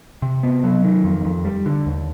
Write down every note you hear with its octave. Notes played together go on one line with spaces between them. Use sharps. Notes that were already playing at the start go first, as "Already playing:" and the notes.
C3
B3
F#3
D#3
F2
F2
G3
D3
D#2